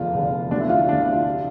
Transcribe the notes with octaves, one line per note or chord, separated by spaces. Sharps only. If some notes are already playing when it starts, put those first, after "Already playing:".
Already playing: F1 E2 D3 F4
F1 E2 D3
D2 D3 D4
E4
F4
D2 D3 D4
E4
F4
C3 E3